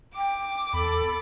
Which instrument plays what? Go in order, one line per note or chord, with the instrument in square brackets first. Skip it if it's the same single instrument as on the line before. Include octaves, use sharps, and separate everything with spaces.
[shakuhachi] G5 [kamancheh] D6
[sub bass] E2 [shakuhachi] A4 [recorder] B5